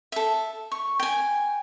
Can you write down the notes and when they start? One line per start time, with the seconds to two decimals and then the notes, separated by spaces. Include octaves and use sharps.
0.12 A4 E5
0.72 C#6
1.00 G5 G#5